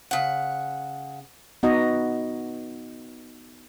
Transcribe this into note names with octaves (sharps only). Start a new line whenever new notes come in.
C#3 F#5
B3 D#4 F#4 D#5